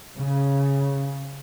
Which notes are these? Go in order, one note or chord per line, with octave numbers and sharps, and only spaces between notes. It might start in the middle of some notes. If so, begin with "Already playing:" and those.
C#3